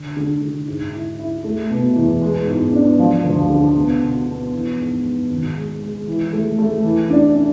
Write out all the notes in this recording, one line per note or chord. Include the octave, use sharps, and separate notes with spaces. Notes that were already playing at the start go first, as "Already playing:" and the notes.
Already playing: D3
D3
D3
G#2
E4
E4
A3
B2
E2
G#3
G#2
D4
F3
D2
D3
B3
B2
B3
E3
G#2
G#2
G#1
G#3
G#3
E3
A3
A3
E3
D4
D4